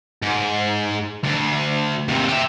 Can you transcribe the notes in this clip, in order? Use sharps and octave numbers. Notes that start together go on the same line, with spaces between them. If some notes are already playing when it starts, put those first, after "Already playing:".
G#2
D2
D#2 C3
G4 E5